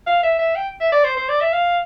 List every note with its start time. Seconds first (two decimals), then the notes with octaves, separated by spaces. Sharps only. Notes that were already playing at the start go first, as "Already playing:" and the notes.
0.07 F5
0.23 E5
0.39 E5
0.55 G5
0.80 E5
0.92 D5
1.04 C5
1.16 C5
1.29 D5
1.41 E5
1.53 F5